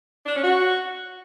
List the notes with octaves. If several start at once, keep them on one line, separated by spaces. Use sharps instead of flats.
D4
C#4
F#4